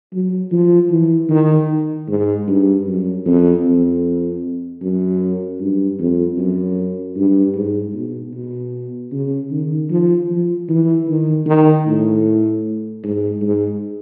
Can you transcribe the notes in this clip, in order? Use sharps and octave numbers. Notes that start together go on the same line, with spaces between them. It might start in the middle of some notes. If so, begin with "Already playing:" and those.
F#3
F3
E3
D#3
G#2
G2
F#2
F2
F2
F#2
G2
F2
F#2
G2
G#2
B2
B2
C#3
D#3
F3
F3
E3
D#3
D#3
A2
G#2
G#2